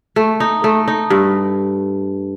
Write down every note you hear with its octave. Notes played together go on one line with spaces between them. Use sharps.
A3
D#4
A3
D#4
G2